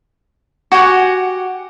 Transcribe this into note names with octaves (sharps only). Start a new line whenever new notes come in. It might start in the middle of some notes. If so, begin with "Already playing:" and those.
F#4 G4 F#5 G#5